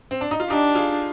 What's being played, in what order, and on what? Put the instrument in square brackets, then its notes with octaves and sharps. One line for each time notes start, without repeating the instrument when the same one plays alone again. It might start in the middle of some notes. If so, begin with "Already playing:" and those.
[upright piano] C4
D4
D#4
F4
[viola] D4 [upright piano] D#4 G4
[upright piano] F4 G#4